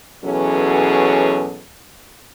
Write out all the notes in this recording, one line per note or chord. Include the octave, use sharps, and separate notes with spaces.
B2 E3 F#3 C#4 G#4 A4